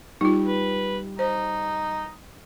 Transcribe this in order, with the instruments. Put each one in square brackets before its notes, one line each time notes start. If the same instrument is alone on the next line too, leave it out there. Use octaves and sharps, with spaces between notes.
[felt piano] G3 [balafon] D#4 F4
[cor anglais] B4
[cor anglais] D#4 [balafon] C5